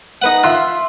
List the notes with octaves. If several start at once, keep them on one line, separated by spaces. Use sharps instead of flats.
D#4 B4 F#5
F4 E5 C6 F#6